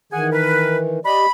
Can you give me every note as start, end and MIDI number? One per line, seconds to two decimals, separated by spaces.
0.13 1.00 51
0.13 1.00 52
0.13 0.27 68
0.13 0.27 78
0.13 0.27 80
0.31 0.77 70
0.31 0.77 71
1.05 1.26 67
1.05 1.26 74
1.05 1.26 75
1.05 1.32 83